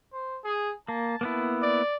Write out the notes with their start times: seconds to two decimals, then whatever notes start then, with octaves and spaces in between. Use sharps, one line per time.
0.13 C5
0.44 G#4
0.88 A#3 A5
1.21 A#3 B3 E4
1.62 D5